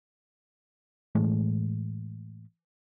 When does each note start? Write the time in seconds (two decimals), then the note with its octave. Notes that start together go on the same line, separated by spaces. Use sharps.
1.15 A2 E3 G#3 A3